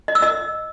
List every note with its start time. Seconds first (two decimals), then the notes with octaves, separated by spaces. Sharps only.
0.08 D#5
0.15 E6
0.22 D#5